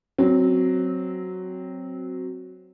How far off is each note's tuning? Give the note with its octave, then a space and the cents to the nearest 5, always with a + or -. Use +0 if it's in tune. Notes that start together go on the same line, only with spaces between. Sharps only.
F#3 +0 C4 +0